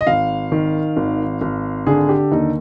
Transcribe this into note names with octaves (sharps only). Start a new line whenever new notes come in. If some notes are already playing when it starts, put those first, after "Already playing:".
D#5
G#1 F5
D#3
G#1
G#1
D3 G#4
G4
D#2 D#4